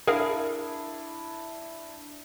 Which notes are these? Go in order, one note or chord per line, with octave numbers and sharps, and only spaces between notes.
D4 E4 G#4 A#4 F5